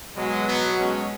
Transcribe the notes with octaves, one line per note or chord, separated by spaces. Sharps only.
B2 F#3 G#3
B3
G#3 C#4